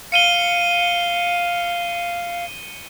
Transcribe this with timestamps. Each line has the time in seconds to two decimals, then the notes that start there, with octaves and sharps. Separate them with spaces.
0.12 F5 C#7 D#7 G7